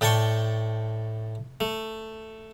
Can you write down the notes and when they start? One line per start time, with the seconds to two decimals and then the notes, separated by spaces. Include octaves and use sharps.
0.01 A2 D5 G5 A5 C6 C#6
1.60 A3